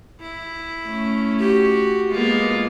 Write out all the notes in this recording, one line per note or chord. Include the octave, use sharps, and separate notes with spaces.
E4
A3 C#4
F#4 G4
G#3 A#3 B3 F4